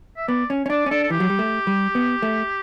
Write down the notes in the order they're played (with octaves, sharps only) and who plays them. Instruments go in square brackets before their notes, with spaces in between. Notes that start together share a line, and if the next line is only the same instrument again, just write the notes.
[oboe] E5
[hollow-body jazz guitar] B3 [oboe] D5
[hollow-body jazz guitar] C#4
C#4
[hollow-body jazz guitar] D4 [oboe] D5
[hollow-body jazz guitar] C#4
[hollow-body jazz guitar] D4 [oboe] A4
[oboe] A4
[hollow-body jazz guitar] E3 [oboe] G4
[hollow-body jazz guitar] F#3
G3
A3
G3
B3
A3